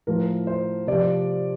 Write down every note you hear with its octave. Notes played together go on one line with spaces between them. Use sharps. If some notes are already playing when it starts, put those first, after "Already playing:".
A2 F3 A#4
C5
C3 F3 D5